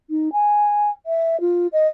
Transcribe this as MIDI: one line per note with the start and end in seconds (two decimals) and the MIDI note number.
0.09 0.32 63
0.32 0.89 80
1.06 1.39 76
1.40 1.67 65
1.72 1.87 75